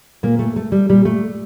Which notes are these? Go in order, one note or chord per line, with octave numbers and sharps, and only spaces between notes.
A#2 A#3
A3
A3
G3
A#2 G3
A3